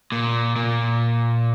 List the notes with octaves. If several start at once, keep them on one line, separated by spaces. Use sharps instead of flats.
A#2
A#2